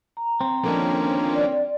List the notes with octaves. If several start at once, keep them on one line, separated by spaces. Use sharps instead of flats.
A#5
C4
D3 D#3 F3 A#3 C#4 D4
D5